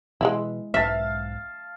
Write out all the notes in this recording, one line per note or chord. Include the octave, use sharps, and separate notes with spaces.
B2 E3 G#3 D#4 E4
B1 G#2 E5 F5 A5